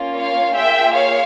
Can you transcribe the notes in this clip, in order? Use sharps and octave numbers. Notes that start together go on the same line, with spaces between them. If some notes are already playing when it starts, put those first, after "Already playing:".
Already playing: A#3 C#4 F4
C#5 F5
A#3 F4 G#4 E5 G5
C#5 F5